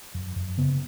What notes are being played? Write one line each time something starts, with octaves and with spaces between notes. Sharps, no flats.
F#2
F#2
C#3 B3